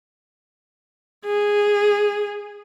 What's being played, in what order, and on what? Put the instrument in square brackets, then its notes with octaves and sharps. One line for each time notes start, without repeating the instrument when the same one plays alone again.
[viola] G#4